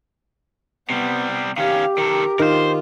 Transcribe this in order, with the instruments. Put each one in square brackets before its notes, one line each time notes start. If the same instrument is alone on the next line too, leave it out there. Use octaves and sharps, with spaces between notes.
[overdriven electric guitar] C3 G3 [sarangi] B3
[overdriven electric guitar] D#3 C#4 [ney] G4 [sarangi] F5
[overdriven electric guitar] D#3 A4 [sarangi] A#4
[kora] D#3 [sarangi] F4 [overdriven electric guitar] A#4 C5